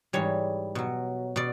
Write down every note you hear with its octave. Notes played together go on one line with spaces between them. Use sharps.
G#2 E3 G3 C#5
B2 F#3
B2 D5